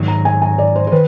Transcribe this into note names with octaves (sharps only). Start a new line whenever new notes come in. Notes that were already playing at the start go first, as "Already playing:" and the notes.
Already playing: G#2 D#3 F#3
A#5
G#5
G#5
D5
C5
C5
D#3 B4